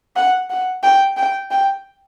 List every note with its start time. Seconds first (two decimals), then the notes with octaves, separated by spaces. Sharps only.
0.16 F#5
0.50 F#5
0.83 G5
1.17 G5
1.51 G5